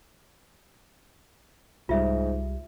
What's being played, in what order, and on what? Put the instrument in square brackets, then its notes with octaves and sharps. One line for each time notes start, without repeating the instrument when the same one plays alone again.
[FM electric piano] C2 G3 [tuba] G#2 [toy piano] F4 E5